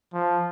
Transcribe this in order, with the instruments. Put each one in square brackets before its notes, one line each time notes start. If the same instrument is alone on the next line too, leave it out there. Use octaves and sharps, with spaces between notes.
[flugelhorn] F3